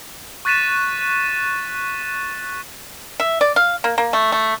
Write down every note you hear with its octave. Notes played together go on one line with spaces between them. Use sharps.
C#6 F#6 A6 B6 D#7 E7
E5
D5
F5
A#3
A#3
A3
A3